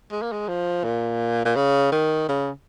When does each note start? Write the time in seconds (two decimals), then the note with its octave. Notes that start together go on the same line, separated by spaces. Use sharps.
0.12 G#3
0.22 A#3
0.32 G#3
0.48 F3
0.84 A#2
1.45 A#2
1.56 C#3
1.92 D#3
2.29 C#3